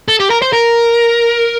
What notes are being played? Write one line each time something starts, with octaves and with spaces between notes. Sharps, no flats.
A4
G4
A#4
C5
A#4